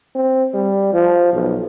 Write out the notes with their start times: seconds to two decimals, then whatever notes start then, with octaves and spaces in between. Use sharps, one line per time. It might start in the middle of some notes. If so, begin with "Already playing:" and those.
0.15 C4
0.54 G3
0.93 F3
1.33 B1